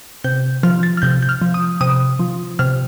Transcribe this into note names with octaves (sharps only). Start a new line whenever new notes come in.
C3 G6
F3 F6
A6
F6
C3 G6
G6
F6
F3
D#6
C3 D#6
F3
C3 F6